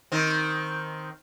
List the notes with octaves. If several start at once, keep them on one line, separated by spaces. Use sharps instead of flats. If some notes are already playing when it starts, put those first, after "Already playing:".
D#3 C4